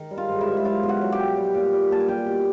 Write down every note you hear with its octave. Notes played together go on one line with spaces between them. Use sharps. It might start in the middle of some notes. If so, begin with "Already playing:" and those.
Already playing: D#3
G3
F4 F5
G#2
E4 E5
G#2
E5
F#3 F4 F5
B2
F#4 F#5
F#3
G4 G5
B2
G3
A#2
G3
A#2 A5
G#5
G3 G4 G5
B2